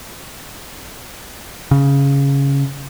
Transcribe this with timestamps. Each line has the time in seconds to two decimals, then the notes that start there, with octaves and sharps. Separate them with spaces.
1.71 C#3